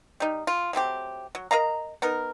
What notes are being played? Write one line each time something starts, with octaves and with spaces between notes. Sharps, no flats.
G3 D#4
F4
F#3 A3 C4 G4
F#3
A#4 D#5 F5 A#5
B3 D#4 A#4